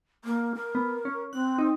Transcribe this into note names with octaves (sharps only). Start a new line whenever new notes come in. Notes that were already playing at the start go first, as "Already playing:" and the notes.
A#3
A#4
B3
C#4
C4 F#6
D#4